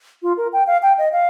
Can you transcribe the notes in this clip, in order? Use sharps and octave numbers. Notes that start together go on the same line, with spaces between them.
F4
A#4
G5
F5
G5
D#5
F5